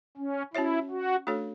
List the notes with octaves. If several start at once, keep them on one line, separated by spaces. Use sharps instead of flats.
C#4
C#4 E4 F#4 C#5 E5
F#4
A3 D4 F#4 A4 C#5